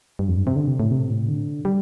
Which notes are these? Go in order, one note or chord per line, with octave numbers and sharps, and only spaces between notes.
G2
F2
G2
C3
D3
C3
A2
C3
A2
D3
G3